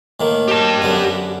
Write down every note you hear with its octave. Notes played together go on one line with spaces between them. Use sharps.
A2 D#3 A#3
G4 A5
F#2 D3 B3